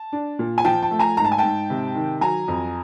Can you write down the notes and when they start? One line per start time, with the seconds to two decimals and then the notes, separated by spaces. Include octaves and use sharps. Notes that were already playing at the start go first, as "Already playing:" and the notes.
Already playing: A5
0.12 D4
0.39 A#2
0.58 G#5
0.64 F3 G5 A5
0.82 G5 A5
0.91 A3
0.99 G#5 A#5
1.17 G#2 A#5
1.24 A5
1.32 G#5
1.38 G#2 G5 A5
1.70 C3
1.95 D#3
2.21 F#3 G#5 A#5
2.48 F2